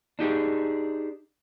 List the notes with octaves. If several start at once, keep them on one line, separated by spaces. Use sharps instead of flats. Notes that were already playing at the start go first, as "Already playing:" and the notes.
D4 D#4 G4 G#4